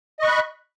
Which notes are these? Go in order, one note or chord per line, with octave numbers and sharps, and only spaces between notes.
D#5 B5 C#6 F#6